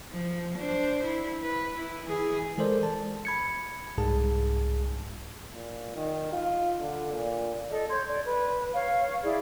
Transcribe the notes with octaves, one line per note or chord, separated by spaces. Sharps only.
F3
D4 C5
E4
B4
E4
E3 G#4
E3 G#3 A4 A#4 C5 D5
A5
B5 G#6 C#7
C2 G#2 G#4 A5
A#2
D#3
F4
D3
A#2
A4 D#5
C#5 C6 G6 G#6
D5
B4
C#5 F5
E4 G#4 D5